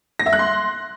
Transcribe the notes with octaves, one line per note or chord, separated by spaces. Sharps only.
A#6
E5
F#6
C6